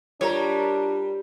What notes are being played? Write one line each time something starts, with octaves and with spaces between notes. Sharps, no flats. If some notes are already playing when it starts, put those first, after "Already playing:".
G3 D4 F4 A#4 C#5 A#5